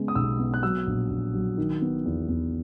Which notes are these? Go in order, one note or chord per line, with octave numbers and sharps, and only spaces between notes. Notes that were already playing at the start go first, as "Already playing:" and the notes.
Already playing: C#3 G#3 B3
D#6
B1 E6
B3
F#6
F#3 E6
A#1
A#1
F#3
D#3
B3
E2
E2